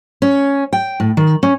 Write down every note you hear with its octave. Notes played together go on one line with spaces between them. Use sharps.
C#4
G5
A2
D#3
C#4